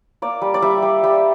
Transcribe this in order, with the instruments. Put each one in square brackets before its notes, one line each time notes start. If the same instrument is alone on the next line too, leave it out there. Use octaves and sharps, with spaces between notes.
[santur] A#3 D5
G3
D5
G3 E5
G3
G3